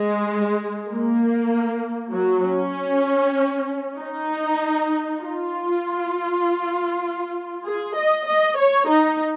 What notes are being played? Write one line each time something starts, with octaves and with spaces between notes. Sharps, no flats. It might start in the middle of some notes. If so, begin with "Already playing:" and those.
Already playing: G#3
A#3
F#3
C#4
D#4
F4
G#4
D#5
D#5
C#5
D#4